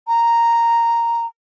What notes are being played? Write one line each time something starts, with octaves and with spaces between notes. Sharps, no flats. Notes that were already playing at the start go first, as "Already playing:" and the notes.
A#5